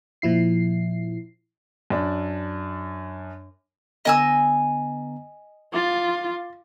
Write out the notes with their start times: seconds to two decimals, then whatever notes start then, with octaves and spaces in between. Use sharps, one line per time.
0.22 A#2 F3 E4 C7
1.90 F#2 D4
4.05 D3 B3 D#5 G#5 A#5 E6
5.74 F4 D6 A6